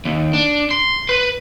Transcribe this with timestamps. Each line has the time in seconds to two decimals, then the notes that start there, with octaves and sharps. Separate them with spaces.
0.05 D#2
0.33 D4
0.71 C6
1.09 B4